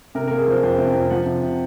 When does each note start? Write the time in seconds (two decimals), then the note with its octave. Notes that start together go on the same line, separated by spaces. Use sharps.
0.15 C3 A#4
0.27 A#3 A#4
0.38 G#4
0.47 F3 C5
0.63 F2 C5
0.78 C3
0.94 F2
1.10 F3 F#5
1.26 C3
1.42 C3